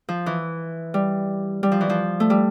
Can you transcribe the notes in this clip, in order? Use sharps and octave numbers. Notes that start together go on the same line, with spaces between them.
F3
E3
G3
G3
F3
E3
F3
A3
G3